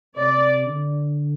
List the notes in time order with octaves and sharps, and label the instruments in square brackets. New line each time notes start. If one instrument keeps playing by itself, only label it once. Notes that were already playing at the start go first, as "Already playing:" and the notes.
[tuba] C3 [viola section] D5
[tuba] D3